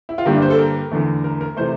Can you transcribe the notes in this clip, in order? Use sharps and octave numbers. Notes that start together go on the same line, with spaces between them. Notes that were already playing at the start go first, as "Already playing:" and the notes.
E4
F4
G2 D3 G3 A#3 E4
D4
C5
A4
A#4
E2 D3 A3
A#4
A#4
C3 E3 A3 C5